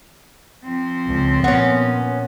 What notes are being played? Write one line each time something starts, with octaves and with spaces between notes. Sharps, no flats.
F3 C4
C#2
A#2 B3 C#4